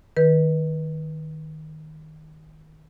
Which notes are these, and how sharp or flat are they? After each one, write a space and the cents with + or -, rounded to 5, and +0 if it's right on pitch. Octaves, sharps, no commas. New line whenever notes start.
D#3 +0 B4 -20